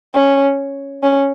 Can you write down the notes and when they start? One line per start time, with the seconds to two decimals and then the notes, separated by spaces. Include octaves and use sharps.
0.14 C#4
1.03 C#4